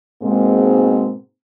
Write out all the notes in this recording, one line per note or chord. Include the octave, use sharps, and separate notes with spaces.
G#2 B2 G#3 A#3 C4 D#4